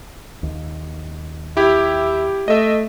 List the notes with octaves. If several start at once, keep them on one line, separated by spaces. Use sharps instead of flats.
D#2
E4 G4 E5
A3 D#5 E5